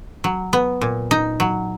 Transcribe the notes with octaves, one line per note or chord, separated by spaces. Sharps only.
F#3
B3
A#2
D#4
F#3